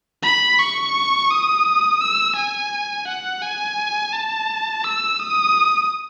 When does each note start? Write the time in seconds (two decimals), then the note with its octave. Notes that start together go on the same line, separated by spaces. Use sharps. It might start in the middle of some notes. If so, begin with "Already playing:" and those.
0.23 B5
0.58 C#6
1.30 D#6
2.01 E6
2.36 G#5
3.07 F#5
3.42 G#5
4.13 A5
4.84 E6
5.20 D#6